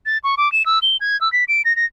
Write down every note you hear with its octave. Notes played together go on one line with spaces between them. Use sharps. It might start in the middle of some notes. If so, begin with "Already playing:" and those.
A6
C#6
D6
E7
E6
G7
G#6
E6
B6
D7
A#6
A#6